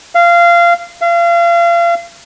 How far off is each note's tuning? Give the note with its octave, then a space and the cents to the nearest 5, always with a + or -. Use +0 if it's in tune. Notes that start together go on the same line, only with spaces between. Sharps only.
F5 -20
F5 -35